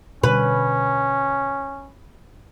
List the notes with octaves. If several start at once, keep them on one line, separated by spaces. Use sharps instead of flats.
B2 D3 G3 C#4 B4